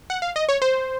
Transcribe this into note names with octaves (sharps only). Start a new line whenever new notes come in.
F#5
F5
D#5
C#5
C5